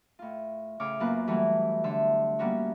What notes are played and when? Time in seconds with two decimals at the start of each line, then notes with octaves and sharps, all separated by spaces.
0.19 A2 F4
0.80 A2 C#3 C#5 D6 F6
1.00 F#2 A#3 B3 F4 B4 F#6
1.28 E3 F#3 G3 A3 E4 F#4
1.84 D3 E5 C6
2.39 G3 A#3 B3 C#4 F#4 C#5